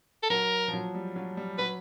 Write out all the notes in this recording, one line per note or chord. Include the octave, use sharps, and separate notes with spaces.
A4
F#3 A#4
F3
F#3
G3
F#3
G3
F#3 B4